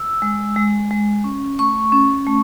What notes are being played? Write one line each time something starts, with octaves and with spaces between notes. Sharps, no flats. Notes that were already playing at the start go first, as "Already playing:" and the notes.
Already playing: E6
G#3
G#3
G#3
C#4
A3 C#6
C#4
A3